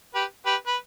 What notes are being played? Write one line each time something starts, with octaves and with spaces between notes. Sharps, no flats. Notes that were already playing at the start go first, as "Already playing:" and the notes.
G4 B4
G4 B4
B4